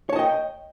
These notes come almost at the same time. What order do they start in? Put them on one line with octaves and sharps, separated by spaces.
C#5 A5 D#5 G5